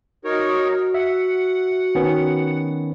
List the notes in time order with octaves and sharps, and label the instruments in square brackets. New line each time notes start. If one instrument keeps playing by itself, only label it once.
[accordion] D#4 A#4 C#5 [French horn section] F#4
[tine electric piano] E5 [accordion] F#5
[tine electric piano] D#3 B3 C#4